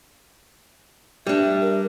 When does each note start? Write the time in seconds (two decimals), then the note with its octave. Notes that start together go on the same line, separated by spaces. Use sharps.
1.27 G3 D4 E5
1.61 A#4